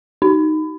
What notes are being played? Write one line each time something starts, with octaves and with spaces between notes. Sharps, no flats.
D#4